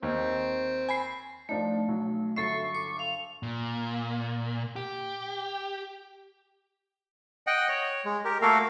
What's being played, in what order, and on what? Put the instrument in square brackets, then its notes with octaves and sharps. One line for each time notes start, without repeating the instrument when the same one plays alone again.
[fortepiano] D#2 [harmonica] C4
[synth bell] G#5 B5 C7
[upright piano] F3 D4 D#4 [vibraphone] A3
[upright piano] B1 F#3
[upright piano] G1 F#3 C7 [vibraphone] A4 E5 [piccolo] C#6
[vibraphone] D6
[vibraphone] F5 [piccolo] F7
[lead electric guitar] A#2
G4
[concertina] D#5 F#5 G5
C#5
G#3
G4 A#4
A3 A#3 F#4 A4 A#4 F5